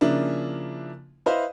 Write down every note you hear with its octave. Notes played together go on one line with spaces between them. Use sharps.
C#3 F3 A#3 D4 E4
E4 B4 C5 D#5 F5